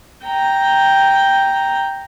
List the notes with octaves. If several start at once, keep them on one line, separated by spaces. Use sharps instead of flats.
G5 A#5